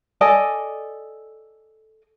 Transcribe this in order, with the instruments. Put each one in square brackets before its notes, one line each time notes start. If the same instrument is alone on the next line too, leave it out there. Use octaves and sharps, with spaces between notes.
[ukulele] A4 D5 D#5 G#5